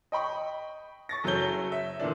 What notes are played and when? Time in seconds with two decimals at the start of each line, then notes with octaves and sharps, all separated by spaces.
0.12 D#5 G5 B5 C#6
1.09 C#6 A6 A#6
1.24 F#1 F#3 A4 C#5 G6 G7
1.72 E5
1.99 A#2 D3 E3 D4